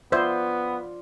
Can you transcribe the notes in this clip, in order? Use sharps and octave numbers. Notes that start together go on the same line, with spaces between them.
B3 F4 C5 D5 E5 E6 G6